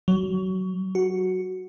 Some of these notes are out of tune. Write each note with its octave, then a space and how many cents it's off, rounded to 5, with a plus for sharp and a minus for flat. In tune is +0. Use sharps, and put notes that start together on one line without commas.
F#3 +20
F#4 +0